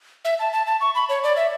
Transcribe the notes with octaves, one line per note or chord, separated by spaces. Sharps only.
E5
A5
A5
A5
C#6
B5
C#5
D5
E5